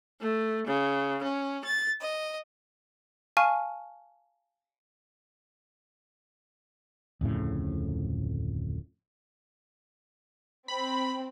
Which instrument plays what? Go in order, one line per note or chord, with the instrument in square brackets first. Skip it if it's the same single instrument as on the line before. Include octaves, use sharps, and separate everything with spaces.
[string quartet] A3
C#3
C#4
A6
D#5
[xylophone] F5 G#5 A5 C#6 F6 D#7
[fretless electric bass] D1 F2 A2 C#3
[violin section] C4 [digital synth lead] B5